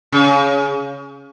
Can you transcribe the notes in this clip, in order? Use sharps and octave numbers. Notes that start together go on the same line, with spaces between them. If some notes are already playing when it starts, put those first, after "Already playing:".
C#3